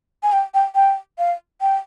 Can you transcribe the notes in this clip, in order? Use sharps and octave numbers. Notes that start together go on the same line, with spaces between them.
G#5
G5
G5
G5
F5
G5